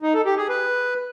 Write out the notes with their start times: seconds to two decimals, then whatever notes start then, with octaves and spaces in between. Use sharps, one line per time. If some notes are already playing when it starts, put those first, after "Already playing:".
0.02 D#4
0.14 A4
0.26 G4
0.37 G#4
0.49 B4